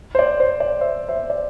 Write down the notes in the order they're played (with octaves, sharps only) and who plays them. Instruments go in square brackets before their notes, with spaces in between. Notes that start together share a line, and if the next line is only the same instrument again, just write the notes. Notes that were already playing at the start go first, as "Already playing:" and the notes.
[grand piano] C5
D5
C5
D5
C5 E5
C5 E5
D5